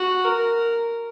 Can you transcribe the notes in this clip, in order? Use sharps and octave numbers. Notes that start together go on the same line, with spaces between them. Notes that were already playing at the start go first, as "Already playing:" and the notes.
Already playing: F#4
A#4